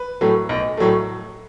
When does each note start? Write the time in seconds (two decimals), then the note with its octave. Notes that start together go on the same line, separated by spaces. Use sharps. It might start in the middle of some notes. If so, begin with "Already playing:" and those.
Already playing: B4
0.21 A2 F#3 A3
0.49 B1
0.77 A2 F#3 A3